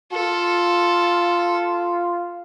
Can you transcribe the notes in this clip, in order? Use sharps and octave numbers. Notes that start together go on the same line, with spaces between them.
F4 A4